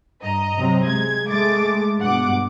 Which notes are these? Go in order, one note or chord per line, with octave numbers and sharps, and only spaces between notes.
G2 D#5 A#5
C3 F#3 C4
G#3 G#6
G#3 A3 D6 A6 D7
G2 B2 F#5 D6